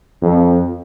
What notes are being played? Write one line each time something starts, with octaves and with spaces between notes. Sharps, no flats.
F2